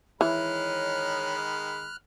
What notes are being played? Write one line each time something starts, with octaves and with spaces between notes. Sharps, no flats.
D#3 E3 G#3 C#5 B5 F6 F#6